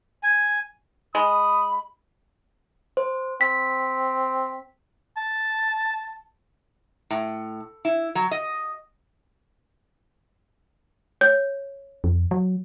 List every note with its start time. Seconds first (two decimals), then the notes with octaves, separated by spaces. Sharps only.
0.23 G#5
1.15 G#3 B5 D#6
2.97 C5
3.41 C4 B6
5.17 A5
7.10 A2
7.85 E4
8.15 F#3
8.31 D#5
11.21 C#5 G6
12.04 F2
12.31 F#3